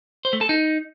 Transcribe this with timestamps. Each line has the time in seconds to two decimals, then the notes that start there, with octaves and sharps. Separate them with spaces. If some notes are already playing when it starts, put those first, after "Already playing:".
0.25 C5
0.33 A3
0.41 A4
0.49 D#4